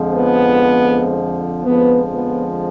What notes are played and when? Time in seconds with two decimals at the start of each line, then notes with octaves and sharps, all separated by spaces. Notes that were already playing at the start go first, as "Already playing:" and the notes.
Already playing: F2 D3 F3 G#3
0.16 B3
1.64 F2 D3 F3 G#3 B3
2.13 B3